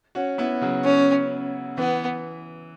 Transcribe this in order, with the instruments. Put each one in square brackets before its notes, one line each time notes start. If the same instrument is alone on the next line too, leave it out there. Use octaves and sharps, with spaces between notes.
[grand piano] C#4 F#4
B3 E4
C#3 F#3
[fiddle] C#4
[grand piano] E3 [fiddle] B3